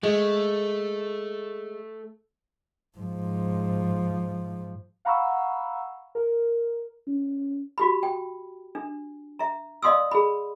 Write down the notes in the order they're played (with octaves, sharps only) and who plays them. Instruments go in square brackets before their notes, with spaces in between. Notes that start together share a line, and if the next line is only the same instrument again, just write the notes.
[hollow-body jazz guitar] G#3 [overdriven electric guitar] A3
[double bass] G#2 F3
[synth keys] F5 F#5 A#5 B5 C#6 E6
A#4
[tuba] C#4
[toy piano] F#4 G4 B5
G5
D4
E5 A#5
D5 D#5 F5 C6 D#6 E6
G#4 B5